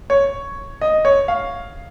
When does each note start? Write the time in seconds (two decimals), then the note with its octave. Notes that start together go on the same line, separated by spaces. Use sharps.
0.10 C#5
0.81 D#5
1.05 C#5
1.28 F5